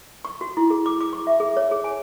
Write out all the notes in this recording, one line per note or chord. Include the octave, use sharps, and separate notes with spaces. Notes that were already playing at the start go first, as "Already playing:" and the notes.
C#6
F#4
E4
G#4
D6
D6
C#6
E5
G#4
C#5
G#4
G#5